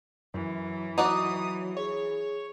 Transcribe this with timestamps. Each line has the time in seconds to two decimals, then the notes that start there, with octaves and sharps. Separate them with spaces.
0.34 F#2 E3
0.98 F#3 D#4 F#4 D5 D#6
1.77 G#4 C#5